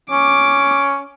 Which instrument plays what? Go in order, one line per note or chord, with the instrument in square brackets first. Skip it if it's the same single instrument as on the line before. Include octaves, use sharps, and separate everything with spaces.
[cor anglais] C#4 [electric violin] D6